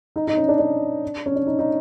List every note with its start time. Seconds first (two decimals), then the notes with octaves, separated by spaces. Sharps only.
0.16 D#4
0.27 D#4
0.37 C#4
0.48 D4
0.59 D4
1.26 C#4
1.35 D4
1.46 D#4
1.59 D#4